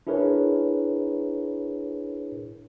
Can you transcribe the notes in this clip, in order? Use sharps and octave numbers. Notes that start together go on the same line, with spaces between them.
D4 E4 G#4 A#4 B4 C#5